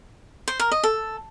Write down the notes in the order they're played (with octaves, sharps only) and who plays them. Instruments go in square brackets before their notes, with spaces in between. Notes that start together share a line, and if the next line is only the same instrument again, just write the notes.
[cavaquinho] C5
A#4
D#5
A4